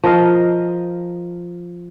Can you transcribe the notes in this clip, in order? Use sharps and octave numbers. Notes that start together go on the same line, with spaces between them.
F3 A#4 D#5 F5